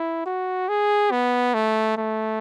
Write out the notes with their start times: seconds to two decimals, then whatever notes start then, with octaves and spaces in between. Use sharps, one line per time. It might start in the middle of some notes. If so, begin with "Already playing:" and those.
Already playing: E4
0.26 F#4
0.69 G#4
1.11 B3
1.54 A3
1.97 A3